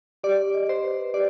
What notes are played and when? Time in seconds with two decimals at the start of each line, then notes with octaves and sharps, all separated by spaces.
0.24 G4 D5
0.54 D#5
0.69 C5
0.84 B4
1.14 G4 D5